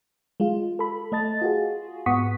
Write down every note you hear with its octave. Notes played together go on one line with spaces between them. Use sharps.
G#3 F4
A4 B5
A3 D#5 A5 A6
F4 F#4 G#4
G#2 B3 F#5 C#6 D#6 B6